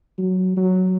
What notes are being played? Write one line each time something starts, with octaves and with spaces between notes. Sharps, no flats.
F#3
F#3